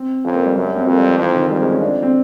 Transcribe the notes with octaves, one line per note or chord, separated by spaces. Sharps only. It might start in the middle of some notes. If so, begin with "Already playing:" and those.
Already playing: C4
F2 C#4
A#3
G3
F#2 F#3
G3
C4
F2 A#3
G3
F3
F2 E3
D#3
F2 G3
G#3
C#4
F2 D4
C4